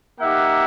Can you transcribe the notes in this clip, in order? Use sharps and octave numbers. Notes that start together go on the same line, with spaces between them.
A#3 D#4 G4 E5 F#5